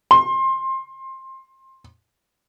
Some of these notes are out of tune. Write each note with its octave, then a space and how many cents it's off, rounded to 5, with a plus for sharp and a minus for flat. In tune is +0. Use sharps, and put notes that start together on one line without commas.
C6 +20